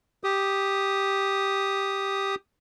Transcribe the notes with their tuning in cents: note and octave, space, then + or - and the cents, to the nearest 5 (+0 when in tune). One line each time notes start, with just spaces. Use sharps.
G4 +0 D#6 +0